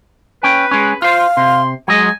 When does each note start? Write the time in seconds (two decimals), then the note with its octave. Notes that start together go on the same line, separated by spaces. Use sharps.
0.43 C#4 B4 G5
0.71 G#3 C#4
1.02 F4 C5 F5
1.37 C3 C6
1.88 F#3 G#3 D#5 G#5